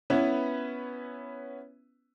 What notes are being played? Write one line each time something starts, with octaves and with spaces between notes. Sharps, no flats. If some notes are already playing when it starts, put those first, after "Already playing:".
B3 C#4 E4 B4